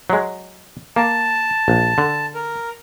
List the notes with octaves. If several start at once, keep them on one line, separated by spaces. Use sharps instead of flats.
F#3 G#3
A#3 A5
A#1
D3
A#4